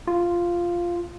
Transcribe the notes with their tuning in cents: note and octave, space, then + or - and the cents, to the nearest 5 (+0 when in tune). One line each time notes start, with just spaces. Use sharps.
F4 -5